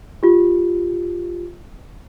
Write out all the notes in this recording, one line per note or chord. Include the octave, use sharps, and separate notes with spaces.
F4 G4